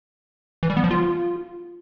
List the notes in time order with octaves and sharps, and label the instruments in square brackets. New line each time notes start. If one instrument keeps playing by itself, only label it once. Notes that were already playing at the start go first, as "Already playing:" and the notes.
[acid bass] E3
G3
B3
F3
F4